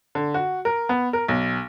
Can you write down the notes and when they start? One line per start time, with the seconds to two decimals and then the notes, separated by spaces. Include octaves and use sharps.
0.15 D3
0.34 F#4
0.65 A#4
0.89 B3
1.13 A#4
1.28 B1